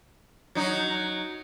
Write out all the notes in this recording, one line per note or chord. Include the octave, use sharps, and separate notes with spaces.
F#3 D#4